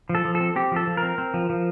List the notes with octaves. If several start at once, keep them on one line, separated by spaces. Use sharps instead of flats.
F3
A4
F3
A4
C4
C4 G4
F3 A4
F3
A#4
C4
C4
F3
F3